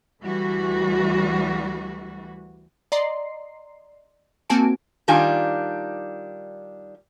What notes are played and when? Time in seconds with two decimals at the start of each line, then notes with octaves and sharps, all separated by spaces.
0.22 D2 E3 G3 F#4
2.92 D5 D#5 A#5 C6 C7
4.50 A#3 C4 F#4 G#5 A5 D7
5.08 D#3 G3 D4 F4 G#5